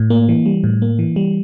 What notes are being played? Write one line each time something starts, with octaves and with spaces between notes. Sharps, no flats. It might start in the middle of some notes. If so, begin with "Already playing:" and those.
Already playing: A2
A#3
E3
G3
A2
A#3
E3
G3